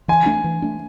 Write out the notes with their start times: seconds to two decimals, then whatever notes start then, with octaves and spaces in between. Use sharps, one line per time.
0.08 E3 G#5
0.26 A3 D4
0.44 E3
0.62 A3 D4